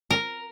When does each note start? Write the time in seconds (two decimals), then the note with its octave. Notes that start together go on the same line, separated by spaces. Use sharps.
0.11 A#4